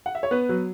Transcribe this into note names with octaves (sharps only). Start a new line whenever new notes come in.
F#5
E5
C#5
B3 B4
F#3